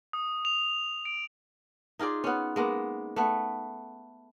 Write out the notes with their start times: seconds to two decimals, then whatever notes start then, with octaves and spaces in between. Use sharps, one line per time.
0.13 D#6
0.45 F7
1.05 D7
1.99 D#4 F4 G#4 D5
2.24 B3 C#4
2.56 G#3 A#3 B3
3.16 A3 B3